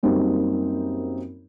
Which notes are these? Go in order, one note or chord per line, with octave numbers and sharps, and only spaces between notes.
F#2 G3 A#3 C4 D#4